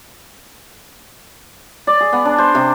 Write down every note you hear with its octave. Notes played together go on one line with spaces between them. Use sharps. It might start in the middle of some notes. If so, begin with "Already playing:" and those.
D5
G#4
B3
D4
C5
C3